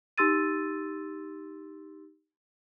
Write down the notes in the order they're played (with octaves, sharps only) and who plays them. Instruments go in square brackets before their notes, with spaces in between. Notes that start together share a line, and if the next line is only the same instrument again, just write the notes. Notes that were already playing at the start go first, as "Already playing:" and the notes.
[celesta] D#4 G4 C6 E6 A6 D#7